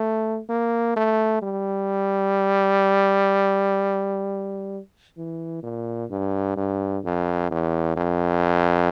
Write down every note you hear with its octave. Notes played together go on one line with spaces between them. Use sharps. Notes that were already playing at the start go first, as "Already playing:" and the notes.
Already playing: A3
A#3
A3
G3
E3
A#2
G2
G2
F2
E2
F2